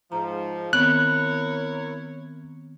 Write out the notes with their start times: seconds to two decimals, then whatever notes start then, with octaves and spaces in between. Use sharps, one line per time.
0.12 G#2 F3 A#5
0.73 D#3 B3 C4 E4 A#4 C#5 F#6